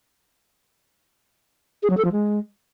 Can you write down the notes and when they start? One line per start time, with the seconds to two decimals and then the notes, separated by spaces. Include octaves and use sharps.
1.83 G#4
1.90 F#3
1.97 A4
2.05 F3
2.12 G#3